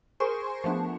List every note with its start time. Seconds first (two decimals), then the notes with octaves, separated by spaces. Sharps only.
0.20 G#4 A#4 C5 G#5 C6 C#6
0.64 F3 A3 B3 D4